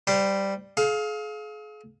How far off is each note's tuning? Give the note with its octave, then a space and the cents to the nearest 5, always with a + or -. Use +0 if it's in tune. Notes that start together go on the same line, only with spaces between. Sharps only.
G3 +0 C5 -25
G#4 +40 F5 +10